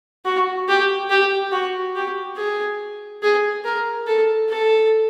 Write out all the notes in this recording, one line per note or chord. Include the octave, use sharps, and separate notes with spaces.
F#4
G4
G4
F#4
G4
G#4
G#4
A#4
A4
A4